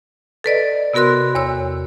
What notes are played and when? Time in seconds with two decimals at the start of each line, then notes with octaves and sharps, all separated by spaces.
0.44 A4 B4 D5 D#5
0.94 C3 B3 F#4 A#4 C6 F#6
1.35 E2 C#5 E6